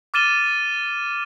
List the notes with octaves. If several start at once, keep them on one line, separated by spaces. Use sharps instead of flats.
D6 F6 A6 D#7 E7 G7